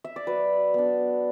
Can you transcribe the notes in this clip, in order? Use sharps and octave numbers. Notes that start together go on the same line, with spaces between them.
E5
D5
F#3 B4
B3 D4